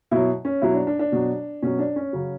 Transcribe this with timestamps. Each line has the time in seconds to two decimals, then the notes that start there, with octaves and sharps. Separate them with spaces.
0.11 B2 F#3 E4
0.45 C#4
0.62 B2 F#3 E4
0.74 D4
0.87 D4
0.99 D4
1.12 B2 F#3
1.62 B2 F#3 C#4
1.79 D4
1.96 C#4
2.13 C#3 F#3